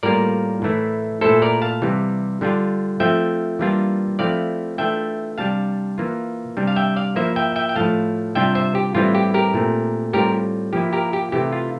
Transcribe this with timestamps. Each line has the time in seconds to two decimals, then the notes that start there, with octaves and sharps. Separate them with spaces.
0.03 A2 G3 A#3 F4 A#4 D5
0.62 A2 E3 A3 E4
1.21 A#2 A3 E4 A4 C5
1.42 A#4 D5
1.62 F5 A5
1.82 C3 E3 G3
2.41 D3 G3 D4 F4
3.00 F3 A3 C4 F4 E5 G5
3.59 E3 G3 A#3 D4 F4
4.19 F3 A3 C4 E4 D5 F5
4.78 E3 A3 D4 F4 E5 G5
5.38 C3 G3 D4 F5 A5
5.98 E3 A#3 F4
6.57 C3 G3 D4
6.67 F5
6.76 E5 G5
6.96 D5 F5
7.16 F3 A#3 E4 C5 E5
7.36 E5 G5
7.56 E5 G5
7.69 G5
7.76 A2 F3 A3 F5 A5
8.35 C3 G3 D4 F4 E5 G5
8.55 C5 E5
8.75 G4
8.94 A2 E3 G3 C4 E4 F4
9.15 G4
9.34 G4 A#4
9.54 A#2 A3 C4
10.13 A2 G3 C4 F4 G4 A#4
10.73 F3 A#3 E4 G4
10.93 G4 A#4
11.13 G4
11.32 C3 E3 A3 E4 G4
11.52 F4